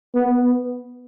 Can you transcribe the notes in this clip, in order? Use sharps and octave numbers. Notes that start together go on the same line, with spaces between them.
B3